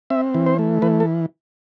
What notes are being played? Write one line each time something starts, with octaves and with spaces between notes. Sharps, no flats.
C4 E5
E3
C5
A3
E3 B4
A4